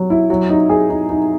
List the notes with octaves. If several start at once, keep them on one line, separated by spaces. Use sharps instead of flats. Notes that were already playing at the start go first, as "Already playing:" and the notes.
Already playing: F#3
E4
F#3
D#4
G#4
D#4
D#4